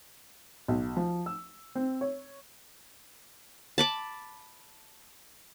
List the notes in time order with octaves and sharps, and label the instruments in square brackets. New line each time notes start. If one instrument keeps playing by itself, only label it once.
[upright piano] B1
F3
E6
C4
C#5
[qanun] A5 B5 D6